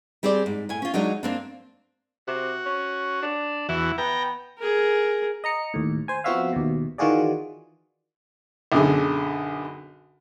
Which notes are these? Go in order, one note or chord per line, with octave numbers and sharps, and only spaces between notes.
G3 C4 G#4 C5 D5
G#2
A2 G#5
C#4 F4
F#3 G#3 D4 D#4 C#5
A#3 C4 D4
C3 F#4
C#4
D4
E2 E3 E4 F#4
B3 G5 A#5
G#4 A#4
D#5 A#5 C#7
D#2 A2
C5 G#5
F3 B3 C4 F#4 E5 F5
D#2 B2
D#3 E3 F4 F#4 G#4 D5
B1 F#2 D3 G#4